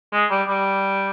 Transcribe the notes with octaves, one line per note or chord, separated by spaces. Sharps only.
G#3
G3
G3